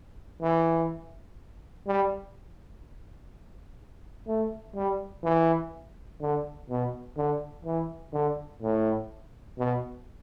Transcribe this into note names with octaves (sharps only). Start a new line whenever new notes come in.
E3
G3
A3
G3
E3
D3
B2
D3
E3
D3
A2
B2